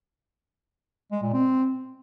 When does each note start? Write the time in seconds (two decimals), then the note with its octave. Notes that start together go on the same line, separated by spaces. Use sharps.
1.12 G#3
1.22 A#2
1.33 C4